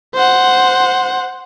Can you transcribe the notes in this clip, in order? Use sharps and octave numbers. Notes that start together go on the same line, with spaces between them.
C5 F#5